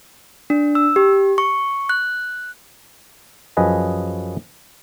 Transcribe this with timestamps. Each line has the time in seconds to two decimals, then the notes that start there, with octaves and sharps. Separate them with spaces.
0.50 D4
0.75 E6
0.96 G4
1.38 C#6
1.89 F#6
3.57 F#2 F3 G#4 B4 D#5 G#5